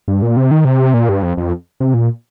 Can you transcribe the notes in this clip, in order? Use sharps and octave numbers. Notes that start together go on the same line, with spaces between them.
G2
A#2
C3
D#3
C3
A#2
G2
F2
F2
C3
A#2